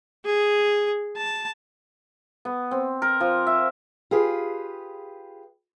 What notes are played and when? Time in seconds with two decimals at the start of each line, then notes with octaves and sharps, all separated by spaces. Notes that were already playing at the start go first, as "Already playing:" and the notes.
0.25 G#4
1.16 A5
2.45 B3
2.71 C4
3.02 A#4
3.20 F3
3.47 E5
4.11 F4 G4 G#4 B4